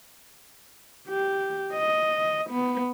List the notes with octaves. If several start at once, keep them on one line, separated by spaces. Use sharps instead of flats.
G4
D#5
B3